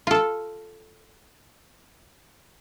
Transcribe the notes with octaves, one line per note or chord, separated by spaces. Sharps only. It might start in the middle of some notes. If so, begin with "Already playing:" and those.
F4 A4